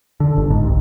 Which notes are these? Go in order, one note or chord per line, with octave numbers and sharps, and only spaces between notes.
D3
G1
G#2
C2